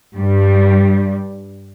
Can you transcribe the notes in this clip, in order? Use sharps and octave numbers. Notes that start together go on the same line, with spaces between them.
G2 G3